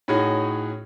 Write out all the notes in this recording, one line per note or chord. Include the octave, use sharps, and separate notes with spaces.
A2 C#4 D#4 F#4 G#4